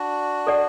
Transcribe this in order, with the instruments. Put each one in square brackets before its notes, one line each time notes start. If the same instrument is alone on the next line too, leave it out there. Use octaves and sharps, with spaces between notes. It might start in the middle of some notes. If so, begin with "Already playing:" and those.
Already playing: [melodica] D4 F#4
[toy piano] A4 D5 F#5